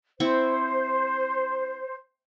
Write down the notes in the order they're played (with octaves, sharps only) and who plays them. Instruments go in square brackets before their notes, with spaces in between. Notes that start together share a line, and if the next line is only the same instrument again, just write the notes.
[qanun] C4 E4 C#6 [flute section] C5